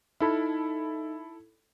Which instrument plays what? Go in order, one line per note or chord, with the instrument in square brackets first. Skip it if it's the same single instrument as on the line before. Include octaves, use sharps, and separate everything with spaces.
[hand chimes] D#4 [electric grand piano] E4 A4 B5